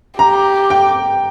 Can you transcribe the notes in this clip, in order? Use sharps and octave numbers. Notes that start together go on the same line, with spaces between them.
G4 A#5
G5